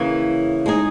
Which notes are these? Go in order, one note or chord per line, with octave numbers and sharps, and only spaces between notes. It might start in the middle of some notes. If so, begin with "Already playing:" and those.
Already playing: C#3 E3 A#3
G#3 D#4 G#4